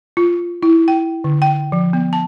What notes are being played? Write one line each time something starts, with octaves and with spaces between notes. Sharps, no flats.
F4
E4
G5
D3
G5
F3
B3
A5